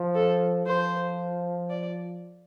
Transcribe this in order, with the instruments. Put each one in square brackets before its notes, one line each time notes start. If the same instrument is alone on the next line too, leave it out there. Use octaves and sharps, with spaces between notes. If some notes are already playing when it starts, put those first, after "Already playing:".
Already playing: [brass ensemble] F3
[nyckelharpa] A4
[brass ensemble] F3 [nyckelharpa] C5
[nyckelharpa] D5